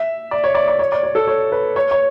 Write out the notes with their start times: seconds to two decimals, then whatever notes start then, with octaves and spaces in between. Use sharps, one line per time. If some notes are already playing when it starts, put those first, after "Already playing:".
Already playing: E5
0.31 D5
0.44 C#5
0.55 D5
0.68 D5
0.79 C#5
0.92 D5
1.03 C#5
1.15 A4
1.27 C#5
1.52 B4
1.76 C#5
1.91 C#5